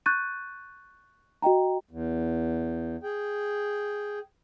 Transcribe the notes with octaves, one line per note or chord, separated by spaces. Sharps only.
C#6 F#6 G6 A6 D#7
F#4 D#5 G5 A#5
E2
G#4 G5